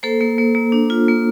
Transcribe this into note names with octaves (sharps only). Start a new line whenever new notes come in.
A#3 A4 C5
A#3
A#3
A#3
D4
F4
A#3